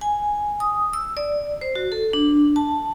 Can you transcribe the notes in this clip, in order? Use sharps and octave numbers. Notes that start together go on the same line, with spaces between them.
G#5
D#6
E6
D5
C5
F#4
A4
D4
A5